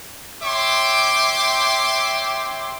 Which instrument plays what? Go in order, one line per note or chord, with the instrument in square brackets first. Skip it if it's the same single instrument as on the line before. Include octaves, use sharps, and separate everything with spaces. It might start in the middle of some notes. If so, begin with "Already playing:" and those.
[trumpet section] C#5 E5 G5 C6 D6